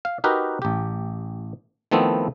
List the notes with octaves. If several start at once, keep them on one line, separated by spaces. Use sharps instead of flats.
F5
D#4 F#4 G4 A#4 B4
A1 G4
D#3 F3 A3 B3 C4 E4